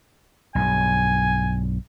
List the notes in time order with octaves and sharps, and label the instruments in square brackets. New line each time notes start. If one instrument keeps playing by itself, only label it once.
[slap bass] B1 G2 [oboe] G#5